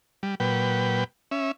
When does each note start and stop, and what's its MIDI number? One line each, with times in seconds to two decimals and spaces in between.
0.23 0.35 55
0.40 1.04 46
0.40 1.04 54
0.40 1.04 71
0.40 1.04 79
1.31 1.52 61
1.31 1.52 76